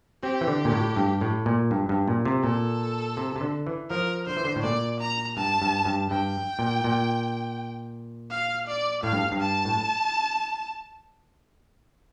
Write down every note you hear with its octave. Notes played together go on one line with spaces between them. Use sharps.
C4 G4
E3
D3
A#2
A2
G2
A2
A#2
G2
G2
A#2
C3
A#2 A4
C3
C3
D3
E3
F3 A#4
D3 C5
E3
D3
A2
A#2 D5
A#5
G2 A5
G2
G2
G2 G5
A#2
A#2
F5
D5
A2 F5
G2
G2
A5
A2